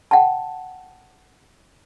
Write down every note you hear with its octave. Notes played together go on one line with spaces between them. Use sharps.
F#5 G5 A5